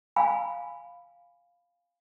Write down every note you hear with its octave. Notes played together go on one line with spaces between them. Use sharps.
F5 G#5 B5